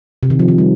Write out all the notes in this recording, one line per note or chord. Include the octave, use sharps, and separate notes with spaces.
C3
D#3
F3
D#3
G3